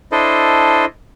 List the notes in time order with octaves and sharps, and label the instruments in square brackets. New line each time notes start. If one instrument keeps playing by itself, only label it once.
[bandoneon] D4 E4 A4 C5 D#5